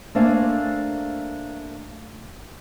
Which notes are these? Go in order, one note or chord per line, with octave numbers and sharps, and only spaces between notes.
A3 A#3 D4 C5 F5 G#5